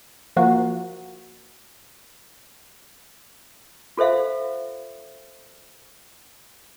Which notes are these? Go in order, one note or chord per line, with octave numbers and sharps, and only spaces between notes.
F3 A#3 F#4
F4 A4 C5 E5 F5